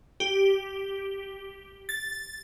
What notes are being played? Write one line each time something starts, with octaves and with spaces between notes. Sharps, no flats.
G4
A6